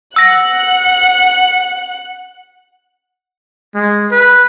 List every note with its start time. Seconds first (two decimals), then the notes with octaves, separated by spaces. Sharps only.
0.16 F#5 E6 F#6 A#6
3.75 G#3
4.11 B4